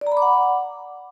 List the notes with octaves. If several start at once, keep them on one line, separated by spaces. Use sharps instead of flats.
D5
A#5
B5
D6
F#5